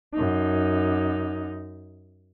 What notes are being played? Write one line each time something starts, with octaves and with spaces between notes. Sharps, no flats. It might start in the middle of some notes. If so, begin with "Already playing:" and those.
F#2 D#4